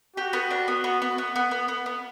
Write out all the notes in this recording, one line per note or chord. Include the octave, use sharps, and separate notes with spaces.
F#4 G4
B3
D4
B3
B3
B3
B3
B3
B3
B3
B3